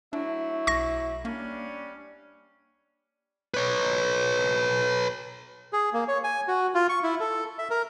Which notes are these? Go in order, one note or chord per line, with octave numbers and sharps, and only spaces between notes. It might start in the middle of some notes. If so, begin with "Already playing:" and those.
F#3 A3 D4 E4
B1 C#6 A#6
G3 A#3 C#4 D4
B4 C#5
G#4
A#3
C#5
G#5
F#4
F4
C#6
E4
A4
E5
A#4